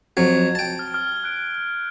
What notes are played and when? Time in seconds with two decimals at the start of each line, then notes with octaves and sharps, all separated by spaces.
0.17 F2 F#3 G#6
0.55 G5 A5
0.79 F6
0.94 F6
1.24 F#6 D7